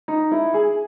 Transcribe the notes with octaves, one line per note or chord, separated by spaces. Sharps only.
D#4
E4
G#4